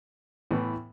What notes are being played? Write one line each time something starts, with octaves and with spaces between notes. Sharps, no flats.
A2 E3 B3